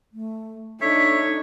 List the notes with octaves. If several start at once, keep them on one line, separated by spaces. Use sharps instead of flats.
A3
D4 D#4 A4 C#5 E5